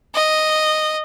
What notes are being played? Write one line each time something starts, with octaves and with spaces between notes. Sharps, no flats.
D#5